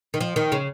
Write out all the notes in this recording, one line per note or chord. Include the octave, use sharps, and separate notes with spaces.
D#3
F3
D#3
C#3 C#4